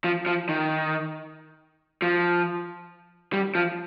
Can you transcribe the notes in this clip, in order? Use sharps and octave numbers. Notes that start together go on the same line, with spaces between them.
F3
F3
D#3
F3
G3
F3